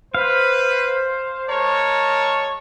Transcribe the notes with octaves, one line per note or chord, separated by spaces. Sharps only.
B4 C5 F5
G#3 A#4 C#5 A5